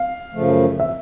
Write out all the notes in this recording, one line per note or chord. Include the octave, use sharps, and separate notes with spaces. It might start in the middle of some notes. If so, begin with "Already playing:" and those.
Already playing: F5
F#2 C#3 F3 A3
E5